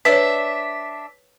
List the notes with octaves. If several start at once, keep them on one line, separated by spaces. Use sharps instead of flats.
D4 B4 C#5 E5 B6